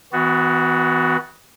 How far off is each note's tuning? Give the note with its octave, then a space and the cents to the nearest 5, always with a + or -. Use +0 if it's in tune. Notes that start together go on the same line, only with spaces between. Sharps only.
E3 -35 B3 +25 F#4 +0